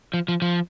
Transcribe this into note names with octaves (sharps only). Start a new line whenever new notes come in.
F3
F3
F3